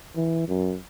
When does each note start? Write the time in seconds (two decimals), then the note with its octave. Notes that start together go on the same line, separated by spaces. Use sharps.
0.16 E3
0.48 F#2